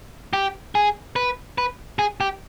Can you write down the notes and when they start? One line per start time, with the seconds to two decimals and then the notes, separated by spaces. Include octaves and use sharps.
0.33 G4
0.75 G#4
1.16 B4
1.58 B4
1.99 G#4
2.20 G4